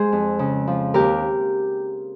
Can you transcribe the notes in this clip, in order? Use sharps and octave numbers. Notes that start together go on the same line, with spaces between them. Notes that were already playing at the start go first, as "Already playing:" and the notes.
Already playing: G#3 G#4 C5
F2
C#3
F3
D#2 G4 A#4